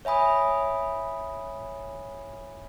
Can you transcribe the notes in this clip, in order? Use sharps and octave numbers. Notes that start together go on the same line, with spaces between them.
C#5 E5 G#5 B5 D#6